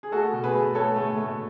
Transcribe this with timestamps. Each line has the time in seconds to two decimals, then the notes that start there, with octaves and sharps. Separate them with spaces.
0.03 G#4
0.12 A3 F#4 A4
0.33 B2
0.44 G#4 B4
0.54 A3
0.75 A3 A4 C#5
0.96 A3
1.17 A3